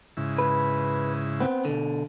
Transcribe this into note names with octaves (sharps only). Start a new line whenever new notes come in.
G#2 C#3 E4
B4
B3 C4
B2 D3